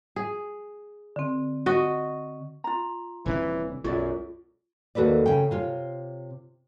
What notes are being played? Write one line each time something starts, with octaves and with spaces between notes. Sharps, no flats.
G#4
D3 C4
F#4 D#5
F4 A#5
D#1 C3 E3 D4
B1 F#2 G#3 F4 C#5 D5 E5
D#2 F#4 A4 B4 D5
C#3 G5
C3 F4 C#5